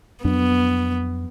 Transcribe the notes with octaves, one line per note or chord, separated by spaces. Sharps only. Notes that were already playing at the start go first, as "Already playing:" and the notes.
F2 F#3 B3 D4